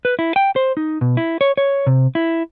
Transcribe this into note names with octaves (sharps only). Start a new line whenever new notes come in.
B4
E4
G5
C5
D#4
B2
E4
C#5
C#5
C3
E4